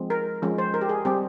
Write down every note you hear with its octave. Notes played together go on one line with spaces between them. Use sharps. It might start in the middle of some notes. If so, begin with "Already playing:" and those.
Already playing: F3 G#3 C4
A#4
F3 G#3 C#4
C5
A#4
G4
G#4
G3 C4 G4